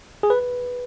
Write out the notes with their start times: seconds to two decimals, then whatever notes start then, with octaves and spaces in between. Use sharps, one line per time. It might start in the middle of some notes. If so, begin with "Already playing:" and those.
0.23 G#4
0.30 B4